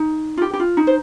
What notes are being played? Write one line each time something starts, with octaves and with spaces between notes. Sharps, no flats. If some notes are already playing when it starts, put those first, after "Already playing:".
Already playing: D#4
F4
G4
G4
F4
D#4
C5